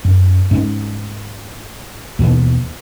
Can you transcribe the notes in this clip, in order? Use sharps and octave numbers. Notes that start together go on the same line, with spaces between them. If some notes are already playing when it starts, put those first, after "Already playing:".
F#2
G#2 C#4
D#2 B2 E3